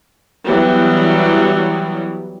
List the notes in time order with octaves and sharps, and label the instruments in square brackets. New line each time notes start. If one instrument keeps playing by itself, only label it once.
[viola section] E3 F#3 G3 B3